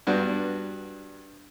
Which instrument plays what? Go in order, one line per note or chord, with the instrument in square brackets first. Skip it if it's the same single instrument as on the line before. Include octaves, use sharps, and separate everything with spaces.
[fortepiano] G2 B3 D4 F#4